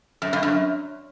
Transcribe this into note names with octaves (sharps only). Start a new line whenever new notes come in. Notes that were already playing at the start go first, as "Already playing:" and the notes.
F#2
G2
F#2